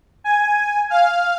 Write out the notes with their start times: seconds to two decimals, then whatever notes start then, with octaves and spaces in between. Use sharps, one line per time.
0.24 G#5
0.90 F5